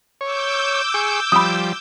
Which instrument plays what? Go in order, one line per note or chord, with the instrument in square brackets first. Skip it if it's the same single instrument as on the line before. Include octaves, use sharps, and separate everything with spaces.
[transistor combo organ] C#5 [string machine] D6 E6 G6
[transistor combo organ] G#4 C#6
[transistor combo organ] F3 G3 [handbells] B5 D#6